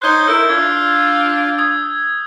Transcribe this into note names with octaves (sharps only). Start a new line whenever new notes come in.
D#4 C5 C#5 F#6 G6 G7
E4 A4 A#4 E6
D4 F4 G#6
D#6 G#6